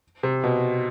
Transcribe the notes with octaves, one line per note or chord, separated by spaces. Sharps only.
C3
B2